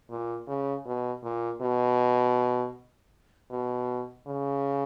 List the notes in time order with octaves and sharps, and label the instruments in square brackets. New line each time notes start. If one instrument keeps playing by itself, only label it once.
[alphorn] A#2
C#3
B2
A#2
B2
B2
C#3